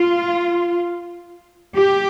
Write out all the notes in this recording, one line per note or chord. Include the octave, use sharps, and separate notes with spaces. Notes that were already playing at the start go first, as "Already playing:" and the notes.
Already playing: F4
G4